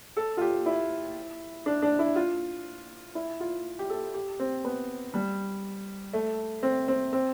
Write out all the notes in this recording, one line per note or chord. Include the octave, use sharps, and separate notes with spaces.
A4
F4
G4
E4
D4
D4
E4
F4
E4
F4
G4
A4
G4
C4
B3
G3
A3
C4
C4
C4